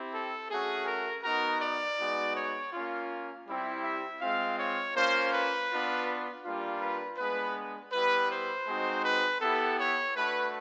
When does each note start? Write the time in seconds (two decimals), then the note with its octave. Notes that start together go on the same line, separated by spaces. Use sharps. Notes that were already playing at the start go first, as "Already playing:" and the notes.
Already playing: C4 E4 G4
0.13 A4
0.50 A3 C#4 F#4 G#4
0.87 A#4
1.23 B3 D#4 F#4 A#4
1.60 D5
1.98 G#3 B3 D#4 F#4
2.35 C#5
2.72 A#3 C#4 F4
3.47 G3 C4 E4 G4
3.84 E5
4.21 G#3 C4 F4 F5
4.58 C#5
4.95 A#3 C#4 F4 C5
5.32 B4
5.69 B3 D4 F4
6.44 G3 A#3 D4 F4
6.81 B4
7.18 G#3 B3 D4 B4
7.92 G3 B3 E4 B4
8.30 C5
8.67 G#3 C4 D#4 F#4
9.04 B4
9.41 B3 E4 G4 A4
9.79 C#5
10.16 A3 D4 F#4 B4